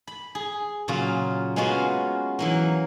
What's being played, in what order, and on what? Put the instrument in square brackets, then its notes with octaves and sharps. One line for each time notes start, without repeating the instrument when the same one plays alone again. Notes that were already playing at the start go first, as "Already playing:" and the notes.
[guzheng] B5
G#4
A#2 C#3 F#3 C#4 F4
G#3 A#3 B3 C#4 F4 F#4
E3 F#3 A#3